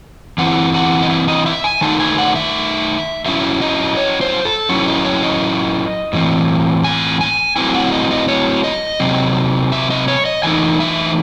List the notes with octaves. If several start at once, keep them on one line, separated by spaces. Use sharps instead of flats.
E3 C4 E4 F#5
F#5
D#5
E5
D#5
E5
G#5
D#3 A3 D#4 A5
G#5
F#5
E5
F#3 C#4 E4 E5
D#5
C#5
C5
A4
F#3 C#4 E4 C#5
D#5
C#5
D#5
A2 E3 C4
G#5
G#5
F#3 A3 C4 E4 G#5
F#5
D#5
D#5
C#5
D#5
C3 F#3 C4
E5
D#5
C#5
D#5
E3 A3 D#4 G#5
E5